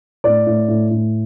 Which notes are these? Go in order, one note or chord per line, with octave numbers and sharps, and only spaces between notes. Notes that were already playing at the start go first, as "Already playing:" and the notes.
A2 D5
A2
A2
A2